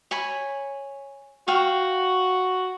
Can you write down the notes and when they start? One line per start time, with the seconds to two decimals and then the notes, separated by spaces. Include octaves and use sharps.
0.11 C#5 G#5 B5
1.48 F#4 F5 G5